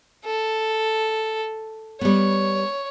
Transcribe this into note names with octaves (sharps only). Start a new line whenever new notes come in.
A4
G3 B3 C#5